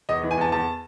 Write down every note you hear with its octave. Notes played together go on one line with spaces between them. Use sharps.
E2 D#5
E3
G#5
E2 A5
E2 A5